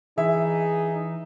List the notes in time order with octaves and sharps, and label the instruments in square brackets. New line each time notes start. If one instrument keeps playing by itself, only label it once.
[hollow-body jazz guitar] E3 [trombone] D#4 [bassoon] G#4 [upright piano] E5